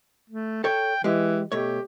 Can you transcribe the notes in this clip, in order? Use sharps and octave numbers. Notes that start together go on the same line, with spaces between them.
A3
A4 C#5 G5
E3 G#3 G4
B2 A3 G4 C#5